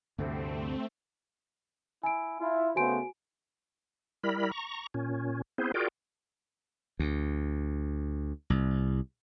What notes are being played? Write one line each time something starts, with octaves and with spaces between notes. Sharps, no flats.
D2 G2 C3 A3 C4
E4 G#5 D7
E4 F4
C#3 A3 B3 F#4 C5 G#5 D7
G3 E4 A#4 B5
A#5 C#6
A#2 C#4
B3 C4 E4 G#4 C5
F4 F#4 G#4 A#4 D5 G5
D2
C2